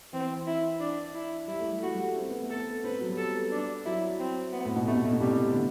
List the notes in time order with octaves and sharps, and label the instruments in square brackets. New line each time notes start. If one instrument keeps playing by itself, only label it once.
[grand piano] E3 [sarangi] C4
[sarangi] E4
D4
E4
[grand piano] G3 [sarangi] E4
[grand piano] A3
G3
[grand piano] A3 [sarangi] F#4
[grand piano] G3
C4
B3
A3
[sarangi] A4
[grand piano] B3
[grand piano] C4 [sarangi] B4
[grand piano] B3
F#3
G3
[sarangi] A4
D4
[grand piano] F#3 [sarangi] E4
[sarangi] C4
B3
[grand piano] A2
B2
[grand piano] C3 [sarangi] A3
[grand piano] B2
A2
B2
[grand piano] C3 [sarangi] G3
[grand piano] D3